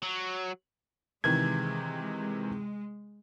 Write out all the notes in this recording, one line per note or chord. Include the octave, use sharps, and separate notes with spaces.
F#3
C3 D#3 E3 G#3 G#6